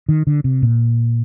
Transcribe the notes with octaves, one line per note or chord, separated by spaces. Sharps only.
D#3
D3
C3
A#2